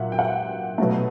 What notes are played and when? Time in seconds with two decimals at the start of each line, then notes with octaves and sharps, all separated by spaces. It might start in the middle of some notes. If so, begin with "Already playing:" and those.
Already playing: A#2 F#3 E5 F#5
0.12 G5
0.19 F#5
0.78 B2 F#3 A3